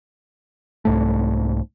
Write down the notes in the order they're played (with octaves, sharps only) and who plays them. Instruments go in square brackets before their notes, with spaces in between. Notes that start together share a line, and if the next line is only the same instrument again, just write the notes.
[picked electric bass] C2 G#2 A3